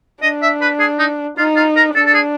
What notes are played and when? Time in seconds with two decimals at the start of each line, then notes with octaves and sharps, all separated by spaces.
0.22 D4 D#5
0.42 E5
0.62 B4
0.80 G#4
0.99 D#4
1.38 D#4 F4
1.56 F4
1.76 A#4
1.95 D4 A4
2.06 A4
2.14 G#4